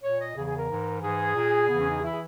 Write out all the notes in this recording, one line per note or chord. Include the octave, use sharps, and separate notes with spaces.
A#2 C#5
D#5
E2 C#3 E3 G#4
G#4
A#4
G#2 E3
G#2 E3 G#4
A#2
E2 C#3 E3 B3
C#4
D#4
E3 E4
G#4